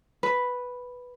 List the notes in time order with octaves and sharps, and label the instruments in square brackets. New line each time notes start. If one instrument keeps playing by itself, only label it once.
[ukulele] B4